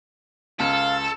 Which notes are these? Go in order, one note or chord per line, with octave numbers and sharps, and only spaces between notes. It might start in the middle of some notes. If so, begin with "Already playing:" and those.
C#2 A4 F5